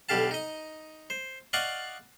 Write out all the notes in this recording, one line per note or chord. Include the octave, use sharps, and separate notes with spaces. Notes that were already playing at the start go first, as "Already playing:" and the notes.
B1 B2 D3 G4 F5 A5
D#4 D#5
C5
D5 D#5 F5 F#5 C#6 D#6